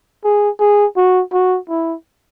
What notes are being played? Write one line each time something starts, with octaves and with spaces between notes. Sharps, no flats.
G#4
G#4
F#4
F#4
E4